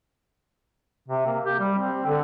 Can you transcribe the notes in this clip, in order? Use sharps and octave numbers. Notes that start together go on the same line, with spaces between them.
C3
A#3
G4
G3
C4
D3